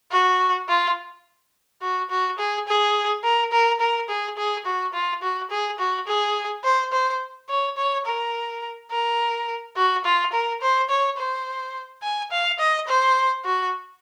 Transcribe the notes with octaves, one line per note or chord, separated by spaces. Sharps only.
F#4
F4
F#4
F#4
G#4
G#4
A#4
A#4
A#4
G#4
G#4
F#4
F4
F#4
G#4
F#4
G#4
C5
C5
C#5
C#5
A#4
A#4
F#4
F4
A#4
C5
C#5
C5
G#5
F5
D#5
C5
F#4